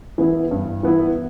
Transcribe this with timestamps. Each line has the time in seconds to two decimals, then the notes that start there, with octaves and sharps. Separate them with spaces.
0.18 E3 B3 E4
0.51 G2
0.83 E3 B3 E4